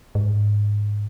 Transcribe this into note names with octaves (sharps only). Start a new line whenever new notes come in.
G#2